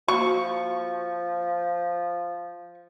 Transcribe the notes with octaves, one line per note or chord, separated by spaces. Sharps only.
F3 A#3 F#4 C#6